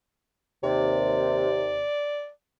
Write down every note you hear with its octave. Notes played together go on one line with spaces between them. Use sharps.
D#2 C3 D5